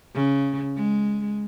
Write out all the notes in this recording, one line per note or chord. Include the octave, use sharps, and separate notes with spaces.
C#3
G#3